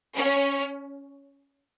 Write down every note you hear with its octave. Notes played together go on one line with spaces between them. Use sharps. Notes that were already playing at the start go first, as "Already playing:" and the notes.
C#4